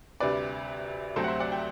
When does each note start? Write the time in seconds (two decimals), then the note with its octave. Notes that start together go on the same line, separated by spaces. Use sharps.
0.20 D2 C3 G3 D4 B4 D5
1.16 D2 C3 F#3 A3 C4 A4 C5
1.24 F#5
1.28 C5 E5
1.40 D5 F#5
1.52 E5 G5